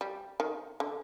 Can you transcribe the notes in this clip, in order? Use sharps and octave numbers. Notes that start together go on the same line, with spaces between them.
G3
D#3
D3